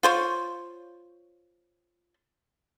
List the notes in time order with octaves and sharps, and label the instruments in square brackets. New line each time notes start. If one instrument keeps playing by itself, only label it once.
[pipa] F4 C5 C#5